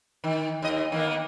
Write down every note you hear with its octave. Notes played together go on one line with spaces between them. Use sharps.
D#3
D#2 D#5
D#3 A#3 B3